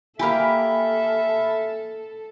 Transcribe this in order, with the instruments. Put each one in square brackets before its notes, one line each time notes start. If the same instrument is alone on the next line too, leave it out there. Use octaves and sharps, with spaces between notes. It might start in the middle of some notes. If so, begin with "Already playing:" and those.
[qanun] A#3 G4 [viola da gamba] A4 [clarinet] E5 [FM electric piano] G#5 B5 F6